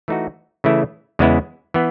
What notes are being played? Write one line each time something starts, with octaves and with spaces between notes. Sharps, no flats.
E3 A3 D#4 F#4
C#3 E3 A3 E4
E2 C#3 G#3 B3 E4
E3 B3